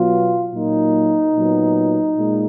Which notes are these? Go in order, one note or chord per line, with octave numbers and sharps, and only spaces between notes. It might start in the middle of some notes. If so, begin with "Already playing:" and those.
Already playing: B2 F#3 B3 F4
A#2 F#3 A#3 D#4
A#2 F#3 B3
A#2 G#3